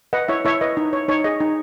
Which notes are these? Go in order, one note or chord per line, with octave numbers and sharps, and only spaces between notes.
B4 D#5 F#5
E4 C#5 E5
E4 C#5 E5
B4 D#5
D#4
C#5
D#4 C#5
G#4 D#5
D#4